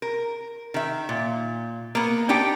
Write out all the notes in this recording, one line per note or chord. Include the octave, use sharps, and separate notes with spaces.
A#4
D#3 E5
A#2
A#3 B3
D4 D#4 G4 G5